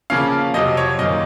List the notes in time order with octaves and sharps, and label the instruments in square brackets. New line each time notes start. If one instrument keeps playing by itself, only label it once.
[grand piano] C#3 F3 A#3 C#4 F5
F2 C3 F#3 C4 D#5
C#5
F#2 D#3 A#3 D#5